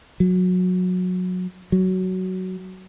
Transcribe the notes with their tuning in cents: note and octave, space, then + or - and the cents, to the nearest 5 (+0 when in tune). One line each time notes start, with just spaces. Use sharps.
F#3 -20
F#3 +10